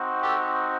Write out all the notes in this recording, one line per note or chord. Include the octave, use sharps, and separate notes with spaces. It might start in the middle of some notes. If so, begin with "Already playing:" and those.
Already playing: C4 D#4 F#4
G4 A4